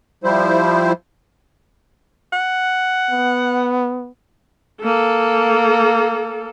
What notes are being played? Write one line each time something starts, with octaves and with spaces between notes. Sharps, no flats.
F3 G3 E4 C5
F#5
B3
A#3 A4